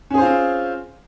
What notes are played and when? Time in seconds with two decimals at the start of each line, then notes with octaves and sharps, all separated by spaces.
0.10 C#4
0.14 G#4
0.18 C5
0.21 F4
0.25 C4